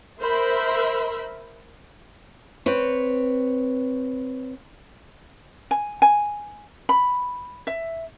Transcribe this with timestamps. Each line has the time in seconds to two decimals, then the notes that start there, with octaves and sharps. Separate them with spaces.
0.20 A#4 C5 E5 B5
2.66 C4 B4 C#5
5.71 G#5
6.02 G#5
6.89 B5
7.67 E5